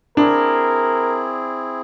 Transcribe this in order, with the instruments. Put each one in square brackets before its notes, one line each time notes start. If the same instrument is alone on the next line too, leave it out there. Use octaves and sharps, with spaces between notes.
[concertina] C4 E4 G#4 [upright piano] D4 [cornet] A#4